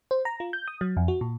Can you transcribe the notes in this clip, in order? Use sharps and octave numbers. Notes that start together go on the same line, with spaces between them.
C5
A#5
F4
G6
D#6
F#3
F2
F#4
A#2